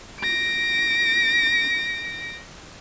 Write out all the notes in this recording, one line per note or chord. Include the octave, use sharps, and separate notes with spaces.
A#6 D7